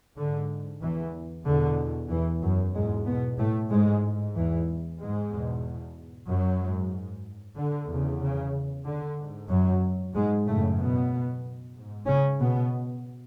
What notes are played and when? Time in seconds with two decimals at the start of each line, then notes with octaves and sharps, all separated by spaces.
0.17 G#2 D3
0.81 E2 E3
1.45 E2 B2 D3
2.10 E2 E3
2.42 F#2 F#3
2.74 E2 G#2 B2 G#3
3.06 B2 B3
3.39 A2 A3
3.71 G#2 G#3
4.03 G#2
4.35 E2 E3
4.99 G#2 G#3
5.32 E2 B2
6.28 F#2 F#3
6.60 G#2
7.57 D3
7.89 E2 C#3
8.21 C#3
8.86 D3
9.18 G#2
9.50 F#2 F#3
10.14 G#2 G#3
10.46 F#2 A2 C#3 A3
10.78 B2 B3
11.75 G#2
12.07 C#3 C#4
12.39 B2 B3